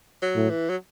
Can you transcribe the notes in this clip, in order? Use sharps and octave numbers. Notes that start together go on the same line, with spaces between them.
F#3
A2
E3
F#3